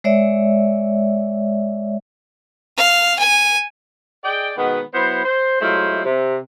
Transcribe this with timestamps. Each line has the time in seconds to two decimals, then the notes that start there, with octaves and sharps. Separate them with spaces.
0.04 G#3 C#5 D5 E5
2.77 F5
3.19 G#5
4.25 G#4 D5 D#5 G5
4.58 B2 D#3 G#3 B3
4.95 F#3 B3 E4 C5
5.25 C5
5.61 F#3 G#3 A3 E4 F4 C5
6.06 C3